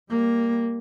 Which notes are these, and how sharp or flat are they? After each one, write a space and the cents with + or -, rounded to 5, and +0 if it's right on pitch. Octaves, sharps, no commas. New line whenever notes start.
G3 +20 A#3 +0